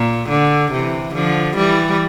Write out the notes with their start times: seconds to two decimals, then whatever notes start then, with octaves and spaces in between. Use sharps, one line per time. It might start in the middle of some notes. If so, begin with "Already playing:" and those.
Already playing: A#2
0.29 D3
0.71 C3 E3
1.14 D3 F3
1.56 E3 G3